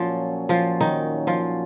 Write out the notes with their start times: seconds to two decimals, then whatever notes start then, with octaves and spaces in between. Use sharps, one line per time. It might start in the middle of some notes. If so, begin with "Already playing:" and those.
Already playing: A#2 F3 F#3 C#4 F4
0.49 F3 F4
0.81 D#3 D#4
1.27 F3 F4